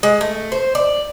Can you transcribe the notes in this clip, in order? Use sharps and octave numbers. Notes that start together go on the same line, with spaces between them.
G#3
A3
C5
D5